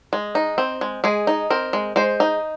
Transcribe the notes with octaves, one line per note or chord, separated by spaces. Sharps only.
G#3
D#4
C4
G#3
G#3 G#4
D#4
C4 A#4
G#3
G#3 C5
D#4